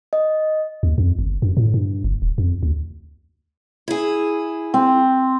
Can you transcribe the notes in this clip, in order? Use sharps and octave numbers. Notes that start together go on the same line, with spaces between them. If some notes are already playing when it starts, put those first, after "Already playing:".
D#5
D#2
F2
G1
F#2
A2
G2
F#1
D1
F2
D2
E4 G#4
C4